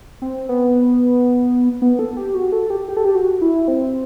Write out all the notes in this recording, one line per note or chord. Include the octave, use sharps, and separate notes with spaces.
C4
B3
B3
A4
G4
F#4
A4
G4
G4
A4
G4
F#4
E4
C4